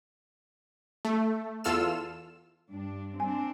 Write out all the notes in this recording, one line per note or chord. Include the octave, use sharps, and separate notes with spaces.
A3
E2 F4 A4 E6 F6 E7
G2 D4
C4 D4 G#5